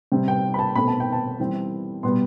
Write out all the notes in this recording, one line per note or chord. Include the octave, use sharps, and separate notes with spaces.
C3 G3 C4
G5
B5
A5
B2 A3 C4 B5
A5
G5
A5
E3 G3 C4
B2 G3 B3 C6